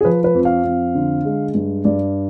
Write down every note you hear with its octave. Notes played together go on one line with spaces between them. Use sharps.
G#4
F3 B4
B4
F2
F5
F2
D3
G#3
G2
G2 D5